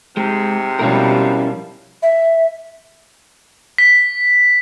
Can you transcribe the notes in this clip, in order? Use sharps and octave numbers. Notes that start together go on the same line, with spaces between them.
G#2 C3 G#3
B2 F3 G3 C#4 E4 A#4
E5
B6